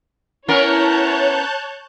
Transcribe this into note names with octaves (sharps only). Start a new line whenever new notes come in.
B3 C#4 E4 A#4 C#5 A5 F#6 G6